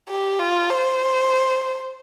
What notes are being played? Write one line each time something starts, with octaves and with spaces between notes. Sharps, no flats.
G4
F4
C5